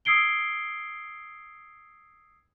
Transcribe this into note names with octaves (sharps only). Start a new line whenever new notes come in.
D#6 E6 G#6 C7 D7 G7